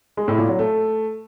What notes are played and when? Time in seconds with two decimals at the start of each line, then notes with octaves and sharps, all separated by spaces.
0.17 G#3
0.28 A2
0.38 A#2
0.49 F#3
0.59 A3